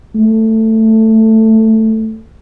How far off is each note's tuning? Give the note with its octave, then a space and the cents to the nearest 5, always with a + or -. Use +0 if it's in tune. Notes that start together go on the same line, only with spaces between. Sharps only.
A3 +10